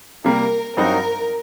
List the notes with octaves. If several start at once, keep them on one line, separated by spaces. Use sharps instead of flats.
C3 G3 A#3 A#4
G2 F#3 C4 D#4 F#4 A#4